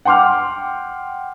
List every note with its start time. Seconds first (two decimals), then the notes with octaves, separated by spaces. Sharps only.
0.05 F#5 G5 C6 D6 F6